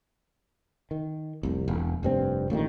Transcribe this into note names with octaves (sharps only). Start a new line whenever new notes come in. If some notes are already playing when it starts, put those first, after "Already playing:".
D#3
F1 C2
E1
F1 G2 C4
A1 A#2 D3 D#3